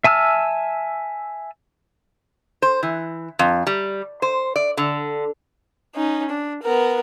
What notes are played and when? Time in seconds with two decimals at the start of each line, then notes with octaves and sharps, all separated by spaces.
0.04 E5 G#5 A5 E6 F6
2.62 C5
2.83 E3
3.39 F2
3.67 G3
4.22 C5
4.56 D5
4.77 D3
5.95 C#4 D#4
6.30 D4
6.63 B3 A#4